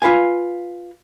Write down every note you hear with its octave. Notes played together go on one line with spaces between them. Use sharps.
F4 B4 F5 G#5